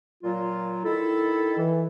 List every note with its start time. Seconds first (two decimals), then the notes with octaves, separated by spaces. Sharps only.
0.23 A#2 F#3 F4
0.85 D#3 E4 A4
1.57 E3